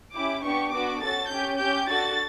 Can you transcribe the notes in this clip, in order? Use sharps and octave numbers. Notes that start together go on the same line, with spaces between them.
C#4 E4 G4 D6
B3 D4 G4 C#6
B3 D4 F#4 D6
C#4 F#4 A4 A6
C#4 G4 G6
C#4 G4 G6
D4 F#4 A4 A6